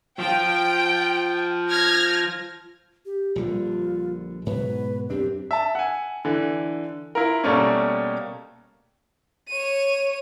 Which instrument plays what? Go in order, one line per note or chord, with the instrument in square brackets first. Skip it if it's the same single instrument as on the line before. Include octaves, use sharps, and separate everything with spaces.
[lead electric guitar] F3 F4 [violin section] G5
[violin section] F6 G#6 A#6
[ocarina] G4
[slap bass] A#1 D3 G3 [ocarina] F4
[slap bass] G#2 B2 F#3 [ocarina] B4
[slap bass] F#2 C4 D4 [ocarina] G4
[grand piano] E5 A5
F#5 G#5
D3 E3
E4 F4 A#4
B2 G3 A3 A#3 C#4
[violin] C#5 D#7